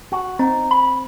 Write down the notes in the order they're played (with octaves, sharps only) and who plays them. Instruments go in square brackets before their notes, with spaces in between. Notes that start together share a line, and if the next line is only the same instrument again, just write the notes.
[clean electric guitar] F#4
[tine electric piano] C4 [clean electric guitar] D#4
[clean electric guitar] B5